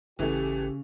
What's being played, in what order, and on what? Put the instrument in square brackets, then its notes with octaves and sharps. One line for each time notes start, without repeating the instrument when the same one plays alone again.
[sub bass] G#1 [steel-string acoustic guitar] C#3 [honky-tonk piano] E3 A3 [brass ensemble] G4